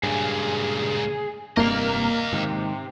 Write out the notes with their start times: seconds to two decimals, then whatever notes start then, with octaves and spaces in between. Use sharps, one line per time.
0.03 C#2 G2 A#2 G#4
1.57 F1 G2 C3 A#3 D#5 F5 A#5
2.33 G#2 C3 D#3